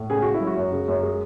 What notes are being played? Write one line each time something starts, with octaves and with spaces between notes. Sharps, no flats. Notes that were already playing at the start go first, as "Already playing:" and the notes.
Already playing: A2
C#3 G#4
C#3 F#4
E4
F#3
F#4
F#2
C#3
F#2
G#3